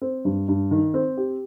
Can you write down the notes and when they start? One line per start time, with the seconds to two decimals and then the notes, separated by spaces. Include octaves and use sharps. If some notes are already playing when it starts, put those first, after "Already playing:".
0.01 C4
0.25 G2
0.48 G2
0.71 D#3
0.94 C4
1.17 G4